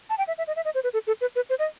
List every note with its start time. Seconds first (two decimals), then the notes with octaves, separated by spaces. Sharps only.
0.10 A5
0.18 G5
0.28 E5
0.38 E5
0.47 D#5
0.56 E5
0.65 D#5
0.75 C5
0.84 B4
0.93 A4
1.07 A4
1.21 B4
1.36 B4
1.50 C5
1.59 D#5